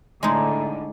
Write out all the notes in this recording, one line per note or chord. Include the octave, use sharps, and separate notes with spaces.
A2 D3 G#3 D#4